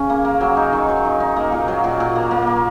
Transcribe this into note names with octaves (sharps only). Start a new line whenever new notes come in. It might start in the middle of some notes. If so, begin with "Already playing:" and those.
Already playing: C#3 C#4
A#3
A#3
F#3
D#4
D#3
F#3
D#4
D#4
A#3
A#2
F#3
A#2
A#2
A#3
A#3
A#3